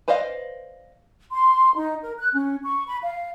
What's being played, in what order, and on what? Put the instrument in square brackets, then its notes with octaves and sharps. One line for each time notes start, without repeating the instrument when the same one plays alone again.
[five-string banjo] B4 C5 D5 D#5 F5
[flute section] C6
D#4
A#4
F#6
C#4
C#6
B5
F5